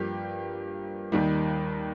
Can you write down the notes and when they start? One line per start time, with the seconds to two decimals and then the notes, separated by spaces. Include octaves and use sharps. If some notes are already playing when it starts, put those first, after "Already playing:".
Already playing: G2 F3 A#3 G4
1.12 D#2 D#3 G3